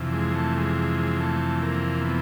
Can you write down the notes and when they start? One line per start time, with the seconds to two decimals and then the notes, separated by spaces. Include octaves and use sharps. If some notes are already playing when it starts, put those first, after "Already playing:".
Already playing: F2 C3 E3
0.13 G#3
0.35 A3
0.57 G#3
0.77 G#3
0.98 G#3
1.20 A3
1.62 A#3
2.05 B3